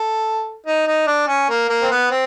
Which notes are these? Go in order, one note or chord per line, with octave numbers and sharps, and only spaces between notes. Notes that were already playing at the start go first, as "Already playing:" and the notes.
Already playing: A4
D#4
D#4
D4
C#4
A#3
A#3
C4
B3
C4